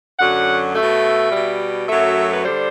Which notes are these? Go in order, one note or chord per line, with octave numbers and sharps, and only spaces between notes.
F#2 D3 F#3 F#5
B2 A3 E5
B2 G3
F#2 F#3 A3 E5
B4
D3 G3 C5